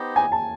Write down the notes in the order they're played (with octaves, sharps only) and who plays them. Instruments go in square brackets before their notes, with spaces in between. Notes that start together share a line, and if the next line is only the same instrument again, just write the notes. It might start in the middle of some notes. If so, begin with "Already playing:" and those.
Already playing: [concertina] B3 D#4 G4 C5 D#5
[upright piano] G#5
A5